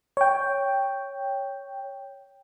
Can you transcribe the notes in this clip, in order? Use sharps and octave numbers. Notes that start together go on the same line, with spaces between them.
C#5 G5